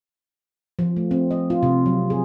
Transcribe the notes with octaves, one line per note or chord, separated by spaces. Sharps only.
F3
A3
C4
D#5
F4
C3
F#3
G#4